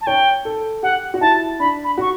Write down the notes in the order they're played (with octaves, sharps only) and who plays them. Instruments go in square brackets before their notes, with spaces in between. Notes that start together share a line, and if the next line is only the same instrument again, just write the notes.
[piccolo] A5
[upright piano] C#5 [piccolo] G5
[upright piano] A4
[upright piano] G4 [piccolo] F#5
[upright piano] F#4
[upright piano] E4 [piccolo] A5
[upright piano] D4 [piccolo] B5
[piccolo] B5
[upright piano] F#4 [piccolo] C#6